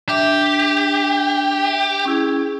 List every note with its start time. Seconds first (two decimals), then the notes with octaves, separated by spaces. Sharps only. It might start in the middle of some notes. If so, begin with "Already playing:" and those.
0.09 D4 G4 E5 D6
2.05 C#4 E4 G#4